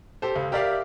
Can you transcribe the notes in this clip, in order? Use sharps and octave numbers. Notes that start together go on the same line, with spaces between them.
G4 A4 C5
C#2
G4 A#4 D5 E5 F5 D6